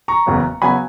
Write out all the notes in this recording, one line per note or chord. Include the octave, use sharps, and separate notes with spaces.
A#5 C#6
F#1 E2 C#3 F#3 B3
C#3 F#3 B3 G#5 B5